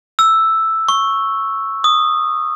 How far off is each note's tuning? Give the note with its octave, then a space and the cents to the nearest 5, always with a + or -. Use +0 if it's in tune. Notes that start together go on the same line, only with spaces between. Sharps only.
E6 +0
C#6 -5
D#6 -10